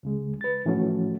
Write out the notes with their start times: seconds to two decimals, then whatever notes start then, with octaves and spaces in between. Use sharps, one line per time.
0.03 C#2 C#3 G#3
0.41 B4 A6
0.65 A2 E3 F3 A3 C#4 F#4